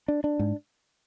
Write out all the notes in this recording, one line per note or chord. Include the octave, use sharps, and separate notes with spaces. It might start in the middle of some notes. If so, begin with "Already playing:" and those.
D4
D4
G#2